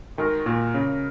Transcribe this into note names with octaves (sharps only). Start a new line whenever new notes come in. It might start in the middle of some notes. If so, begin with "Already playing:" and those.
D#3 G#3 F#4 A#4
A#2
C#3